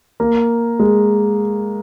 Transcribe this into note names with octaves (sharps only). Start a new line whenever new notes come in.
A#3
G#3